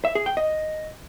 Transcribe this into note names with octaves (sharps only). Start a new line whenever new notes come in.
E5
G#4
G5
D#5